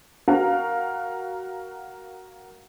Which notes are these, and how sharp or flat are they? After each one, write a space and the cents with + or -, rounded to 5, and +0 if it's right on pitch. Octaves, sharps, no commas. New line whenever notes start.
F#4 +15 A#4 +0 F5 +15